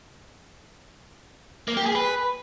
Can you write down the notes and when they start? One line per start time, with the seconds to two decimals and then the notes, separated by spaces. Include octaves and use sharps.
1.68 A#3
1.77 G4
1.86 G#4
1.95 B4